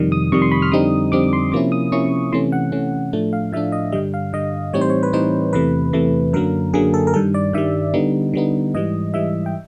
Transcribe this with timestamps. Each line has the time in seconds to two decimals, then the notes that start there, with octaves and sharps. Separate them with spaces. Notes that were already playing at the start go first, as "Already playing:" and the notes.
Already playing: F2 C3 D#3 G3
0.12 D#6
0.32 F2 C3 D#3 G3 C#6
0.42 C6
0.52 B5
0.62 F6
0.72 F2 D3 G3 C4 D#4 D#6
1.12 F2 D3 G3 C4 D#4 D6
1.33 C6
1.52 C3 F3 A#3 C#4 E4 D6
1.72 D#6
1.92 C3 F3 A#3 C#4 E4 C#6
2.32 C3 E3 A3 C#4 C6
2.52 F#5
2.72 C3 E3 A3 C#4
3.13 A2 F3 A3 D4
3.33 F5
3.52 A2 F3 A3 D4 E5
3.72 D#5
3.92 G2 D3 G3 D#5
4.14 F5
4.33 G2 D3 G3 D#5
4.73 A2 E3 G3 C4 D#4 C#5
4.81 C5
4.90 C#5
5.03 B4
5.13 A2 E3 G3 C4 D#4 C5
5.53 E2 C3 E3 A3 B4
5.93 E2 C3 E3 A3
6.33 F#2 D3 F#3 A#3 A#4
6.73 F#2 D3 F#3 A#3 G#4
6.94 A4
7.07 A#4
7.14 G2 D#3 G3 A4
7.34 D5
7.53 G2 D#3 G3 E5
7.94 D3 G3 B3 D#4
8.33 D3 G3 B3 D#4
8.74 G#2 E3 G3 D#5
9.14 G#2 E3 G3 E5
9.46 G5